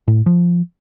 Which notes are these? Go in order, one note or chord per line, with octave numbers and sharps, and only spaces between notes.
A2
F3